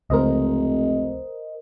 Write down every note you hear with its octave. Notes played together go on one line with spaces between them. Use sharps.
F1 C#2 A#4 C5 D#5